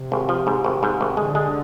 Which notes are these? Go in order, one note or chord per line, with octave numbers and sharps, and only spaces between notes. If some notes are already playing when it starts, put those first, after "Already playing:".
Already playing: C3
G#1
F3
G#2
G#1
G#2
G#1
D3 G#3
G#3